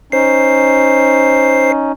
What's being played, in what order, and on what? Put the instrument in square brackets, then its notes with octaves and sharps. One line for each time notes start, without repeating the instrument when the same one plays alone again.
[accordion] C#4 D#4 [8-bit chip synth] C5 C7